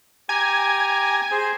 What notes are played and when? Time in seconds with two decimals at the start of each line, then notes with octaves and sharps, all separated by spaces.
0.29 G4 G5 G#5 A#5
1.31 G#4 C5